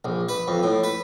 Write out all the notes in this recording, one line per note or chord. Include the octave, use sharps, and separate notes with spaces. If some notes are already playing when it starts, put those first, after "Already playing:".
A#1
B4
F2
A2
B4